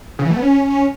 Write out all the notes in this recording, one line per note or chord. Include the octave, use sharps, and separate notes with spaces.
C#3
E3
A3
B3
C#4